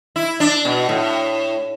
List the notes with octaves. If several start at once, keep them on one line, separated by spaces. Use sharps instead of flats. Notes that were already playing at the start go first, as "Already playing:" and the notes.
E4
D4
B2
A2